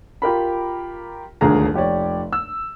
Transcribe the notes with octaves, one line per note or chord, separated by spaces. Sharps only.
F4 G4 A#4 B5
D#1 G#1 D2 A#3 G#4 A#5
F1 G4 C#5 D5
E6